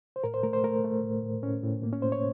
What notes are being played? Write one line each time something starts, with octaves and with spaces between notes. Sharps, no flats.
C5
A2 A#4
C5
A3 A#4
C5
A3 A#4
A3
A2
A2
A2 C#4
A2
A2 A#3
C#4
A2 C5
C#5